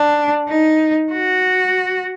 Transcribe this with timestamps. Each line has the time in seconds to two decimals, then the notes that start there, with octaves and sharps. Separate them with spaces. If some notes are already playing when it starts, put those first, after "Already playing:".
Already playing: D4
0.49 D#4
1.12 F#4